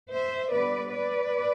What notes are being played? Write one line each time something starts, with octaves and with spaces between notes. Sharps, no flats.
C5 E5
D3 G3 B3 B4 D5
B4 D5